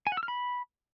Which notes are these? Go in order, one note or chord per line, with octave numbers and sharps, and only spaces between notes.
G#5
F#5
E6
F6
B5